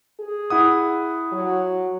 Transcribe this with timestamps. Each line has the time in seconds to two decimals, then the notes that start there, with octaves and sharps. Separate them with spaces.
0.20 G#4
0.50 E4 F#5 D#6
1.32 F#3